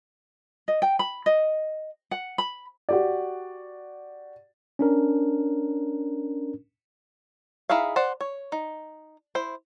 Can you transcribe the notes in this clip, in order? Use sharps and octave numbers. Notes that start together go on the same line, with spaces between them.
D#5
G5
B5
D#5
F#5
B5
F#4 G4 D5
C#4 D4 A#4
D#4 E4 G#4 E5 F5
C5 D5 F#5
C#5
D#4
E4 C5